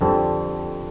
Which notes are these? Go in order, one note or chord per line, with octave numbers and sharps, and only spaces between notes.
F2 D3 G3 C4 A4